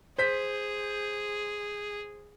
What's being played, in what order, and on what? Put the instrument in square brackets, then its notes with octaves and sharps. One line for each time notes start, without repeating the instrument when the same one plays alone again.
[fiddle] G#4 [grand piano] C5 B6